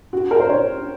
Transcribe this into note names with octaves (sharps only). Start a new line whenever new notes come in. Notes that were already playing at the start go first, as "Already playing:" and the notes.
F#4
A#4
C5
C#5